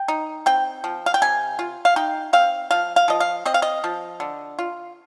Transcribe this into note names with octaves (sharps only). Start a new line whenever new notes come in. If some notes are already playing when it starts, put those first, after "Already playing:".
Already playing: G5
D#4
C4 G5
F3
F5
G5
C3 G#5
F4
F5
D#4 G5
C4 F5
F3 F5
F5
F3 D#5
F5
C4 D#5
F5
D#5
F3
D3
F4